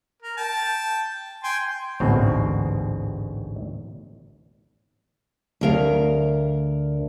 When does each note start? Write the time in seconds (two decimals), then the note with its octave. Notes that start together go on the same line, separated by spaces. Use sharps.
0.22 A#4
0.37 G5 A5
1.44 G5 G#5 C6
2.00 A1 D2 G#2 B2 C4
5.61 D2 A#4 F5